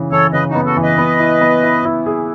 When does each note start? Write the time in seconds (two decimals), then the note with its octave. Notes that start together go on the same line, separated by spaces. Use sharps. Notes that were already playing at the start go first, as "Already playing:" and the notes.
Already playing: C#3 E3
0.12 E3 A4 C#5
0.33 C#3 B4 D#5
0.49 D#4 F#4
0.55 B3
0.66 F#4 A4
0.77 E3
0.82 B4 D#5
0.98 B3
1.20 E4
1.41 B3
1.63 E4
1.85 E4
2.06 G#4